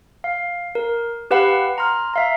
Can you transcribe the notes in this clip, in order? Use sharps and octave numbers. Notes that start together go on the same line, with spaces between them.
F5
A#4
G4 B4 F5 F#5 B5
A#5 C6 F6
E5 F5 A#5